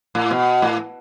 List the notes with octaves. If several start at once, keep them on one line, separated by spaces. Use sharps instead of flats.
A2
B2
A2